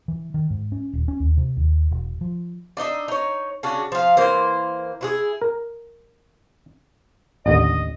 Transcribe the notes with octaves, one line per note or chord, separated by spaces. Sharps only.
E3
D#3
G#2
C#4
D#1
C#4
D#2
C3
D#2
E1
F3
D4 D#4 D#5 E5
D#4 C#5
C#3 C#4 D4 F#4
F3 F5
E3 A#3 C5
E4 F#4 G#4
A#4
A1 D#2 D3 D#5